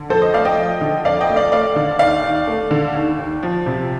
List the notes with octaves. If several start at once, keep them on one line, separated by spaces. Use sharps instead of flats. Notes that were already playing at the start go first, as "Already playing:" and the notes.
Already playing: D3
F2 A4 C5
C5 D#5
A3 D5 F5
D#5 G5
F3
D3
F2 D5 F5
D#5 G5
A3
D5 F5
A3 D5 F5
D3
D#2 D5 F5
D#2
A3
D3
D#2
D#2
F3
C3